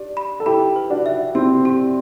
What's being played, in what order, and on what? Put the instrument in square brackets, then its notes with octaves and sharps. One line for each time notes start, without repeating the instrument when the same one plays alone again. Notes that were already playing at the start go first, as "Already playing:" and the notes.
Already playing: [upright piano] D4 [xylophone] G4
[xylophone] B5
[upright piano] A4
[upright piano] E4 G4 [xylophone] B5
[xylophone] B4
[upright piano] D4 F#4
[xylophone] E5
[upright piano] C4 E4 [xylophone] G4
[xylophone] G4